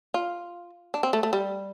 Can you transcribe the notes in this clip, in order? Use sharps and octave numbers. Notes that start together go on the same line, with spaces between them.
F4
D4
C4
A3
A3
G3